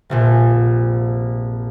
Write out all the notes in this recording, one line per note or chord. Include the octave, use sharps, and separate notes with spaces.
F1 A#1 A#2